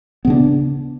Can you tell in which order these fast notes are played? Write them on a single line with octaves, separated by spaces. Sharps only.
B3 C#3 D4